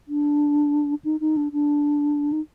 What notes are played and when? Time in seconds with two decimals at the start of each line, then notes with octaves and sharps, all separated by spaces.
0.08 D4
1.04 D#4
1.21 D#4
1.37 D4
1.52 D4
2.32 D#4